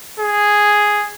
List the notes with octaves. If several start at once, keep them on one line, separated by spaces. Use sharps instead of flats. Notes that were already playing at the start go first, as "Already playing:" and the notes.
G#4